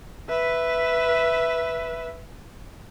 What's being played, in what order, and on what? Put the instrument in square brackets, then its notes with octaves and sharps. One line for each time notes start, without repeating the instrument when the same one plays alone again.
[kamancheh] B4 E5